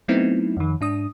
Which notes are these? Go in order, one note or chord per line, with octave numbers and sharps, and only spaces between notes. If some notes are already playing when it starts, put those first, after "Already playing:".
F#3 A3 B3 C4 D#4 E4
F2 D#3
G#2 D4 D#6